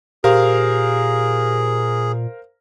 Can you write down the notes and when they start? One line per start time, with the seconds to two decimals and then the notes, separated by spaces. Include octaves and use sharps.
0.24 A#2 G4 G#4 A#4 C5 F5